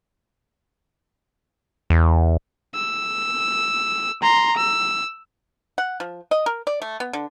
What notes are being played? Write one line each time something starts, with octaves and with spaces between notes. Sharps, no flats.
E2
E6
A#5 C6
E6
F#5
F3
D#5
A#4
D5
A3
B3
D3